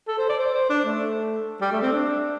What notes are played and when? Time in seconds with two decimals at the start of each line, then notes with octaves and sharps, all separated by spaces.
0.08 A4
0.18 C5
0.29 D5
0.39 C5
0.55 C5
0.69 D4
0.85 A3
1.61 G3
1.72 A3
1.82 C4
1.92 D4